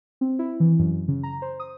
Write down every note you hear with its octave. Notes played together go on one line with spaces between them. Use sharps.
C4
E4
E3
F#2
C#3
A#5
C5
D#6